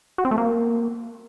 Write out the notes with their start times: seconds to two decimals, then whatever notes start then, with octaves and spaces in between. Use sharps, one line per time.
0.18 F#4
0.25 C4
0.31 A3
0.38 A#3